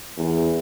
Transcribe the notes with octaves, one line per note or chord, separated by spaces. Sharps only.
E2